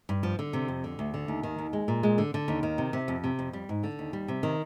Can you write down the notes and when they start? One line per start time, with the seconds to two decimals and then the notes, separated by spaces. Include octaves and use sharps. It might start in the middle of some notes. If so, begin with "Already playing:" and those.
0.09 G2
0.23 F3
0.39 D3
0.53 C3
0.68 F2
0.84 D3
0.99 D2
1.14 D3
1.28 D#2
1.43 D#3
1.58 D#2
1.73 G#3
1.88 A#2
2.03 G#3
2.18 D3
2.34 D3
2.48 D#2
2.63 D#3
2.78 C3
2.93 C3
3.08 F2
3.24 C3
3.39 F2
3.53 G3
3.69 G#2
3.83 D3
3.99 D#2
4.13 G3
4.28 C3
4.43 D#3